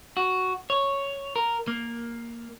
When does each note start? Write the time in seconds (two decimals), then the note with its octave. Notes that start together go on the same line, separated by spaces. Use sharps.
0.17 F#4
0.70 C#5
1.36 A#4
1.68 A#3